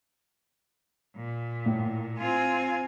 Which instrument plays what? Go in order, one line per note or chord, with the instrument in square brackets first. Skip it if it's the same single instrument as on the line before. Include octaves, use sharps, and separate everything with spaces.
[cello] A#2
[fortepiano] A2
[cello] C4 F4 [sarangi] G#5